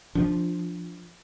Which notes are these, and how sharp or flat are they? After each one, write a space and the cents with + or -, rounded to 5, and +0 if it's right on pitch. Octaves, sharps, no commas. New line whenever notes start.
F3 -5 D4 +0